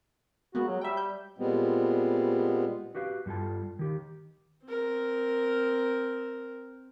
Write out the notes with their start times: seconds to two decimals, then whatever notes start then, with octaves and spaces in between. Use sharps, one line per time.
0.55 G#3 A#3 B3 F#4
0.68 F#3
0.81 G3 E5 G5
0.97 G6
1.38 A#2 G3 G#3 B3 C4
2.95 F#4 G4 B4 F5
3.26 G2 G3 F4 A4 A5
3.79 D#3 G4
4.66 C4 A#4